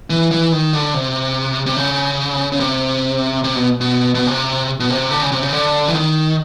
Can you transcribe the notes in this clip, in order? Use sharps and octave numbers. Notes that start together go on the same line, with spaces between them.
E3
E3
D#3
D3
C3
C3
C#3
C#3
C3
C3
B2
B2
B2
C3
B2
C3
D3
C#3
C3
C#3
D3
E3
D#3